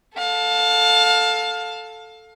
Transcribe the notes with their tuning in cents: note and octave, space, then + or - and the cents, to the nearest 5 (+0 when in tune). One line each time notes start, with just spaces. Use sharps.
A4 +0 F5 +25